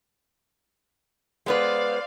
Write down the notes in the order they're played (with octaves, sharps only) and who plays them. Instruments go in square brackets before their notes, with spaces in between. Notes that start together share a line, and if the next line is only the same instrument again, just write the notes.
[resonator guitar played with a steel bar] G#3 B3 B4 [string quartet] C5 D5 F5